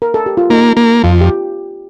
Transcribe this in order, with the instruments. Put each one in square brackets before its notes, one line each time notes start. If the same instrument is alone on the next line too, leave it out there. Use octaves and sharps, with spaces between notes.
[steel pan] A#4
A4
G4
F4
[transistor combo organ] A#3 [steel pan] D#4
[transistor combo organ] A#3
[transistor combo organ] F2 [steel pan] F4
[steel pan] G4